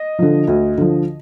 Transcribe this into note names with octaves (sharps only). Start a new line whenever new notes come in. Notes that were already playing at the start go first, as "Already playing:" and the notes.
Already playing: D#5
D3 F3
D2
D3 F3